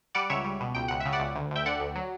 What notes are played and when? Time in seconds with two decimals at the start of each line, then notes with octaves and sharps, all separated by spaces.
0.15 G3 D5 F#5
0.30 C#2 C#5 E5
0.44 G3
0.60 B2
0.75 C#2 G5
0.88 C#2 F#5
1.00 E5
1.06 C#3
1.12 D5 F#5
1.20 C#2
1.35 D2
1.51 D2 E5 G5
1.66 D3 D5 F#5
1.80 D2
1.95 F#3